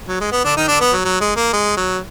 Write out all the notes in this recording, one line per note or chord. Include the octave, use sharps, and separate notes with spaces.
F#3
G#3
B3
D3 D4
D#3 D#4
D3 D4
B3
F#3
F#3
G#3
A#3
G#3
F#3